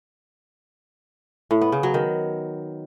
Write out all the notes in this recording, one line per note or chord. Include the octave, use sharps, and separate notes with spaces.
A2
B3
C#3
F#3
D#3